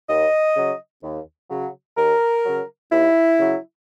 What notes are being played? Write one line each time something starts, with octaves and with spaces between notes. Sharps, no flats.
D#2 D#5
C#3 F#3
D#2
C#3 F#3
D#2 A#4
C#3 F#3
D#2 E4
C#3 F#3